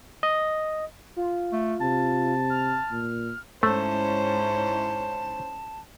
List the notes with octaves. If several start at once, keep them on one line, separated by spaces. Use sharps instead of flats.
D#5
F4
A3
C3 A5
F6
A#2
G#2 A3 C#4 E4 C5 A5